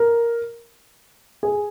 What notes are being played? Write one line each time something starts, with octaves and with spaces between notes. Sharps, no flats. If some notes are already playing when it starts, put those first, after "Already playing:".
Already playing: A#4
G#4